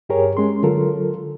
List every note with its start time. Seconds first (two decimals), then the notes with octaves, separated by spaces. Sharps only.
0.09 G2 G4 G#4 A#4 C#5
0.37 G#3 C#4 C6
0.63 D3 F#3 F4 A4 A#4